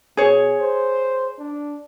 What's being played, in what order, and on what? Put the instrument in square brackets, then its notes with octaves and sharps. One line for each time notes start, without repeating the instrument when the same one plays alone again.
[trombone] B2 [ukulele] G#4 C#5
[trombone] C5
D4